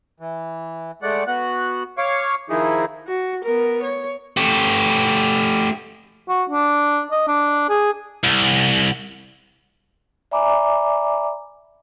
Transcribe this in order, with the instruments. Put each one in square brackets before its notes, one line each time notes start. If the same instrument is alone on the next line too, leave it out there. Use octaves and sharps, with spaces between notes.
[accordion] E3
G#3 A3 D5 F#5
B3 F#4 F#6
C#5 F5 C#6 D6
D#3 F3 D#4 E4 G#4
[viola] F#4
B3 A#4
C#5
[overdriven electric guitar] A3 G4
[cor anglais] F#4
D4
D#5
D4
G#4
[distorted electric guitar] C2
[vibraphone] D5 E5 G#5 A#5 B5 D6